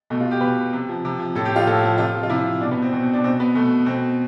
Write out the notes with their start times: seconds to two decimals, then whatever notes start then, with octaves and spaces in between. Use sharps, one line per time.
0.10 B2 A3
0.20 F4
0.31 G4
0.41 B2 B4
0.73 C3
0.89 F3
1.05 C3
1.19 F3
1.35 A2 A4
1.45 G4
1.51 F3 F4
1.67 A2 A4
1.83 F3
1.98 C3 F4
2.14 F3
2.23 F4
2.30 C3 E4
2.45 F3
2.61 B2 D4
2.71 B3
2.82 C4
2.92 B2 C4
3.03 C4
3.13 D4
3.24 B2 C4
3.40 B3
3.55 B2 A3
3.86 B2 C4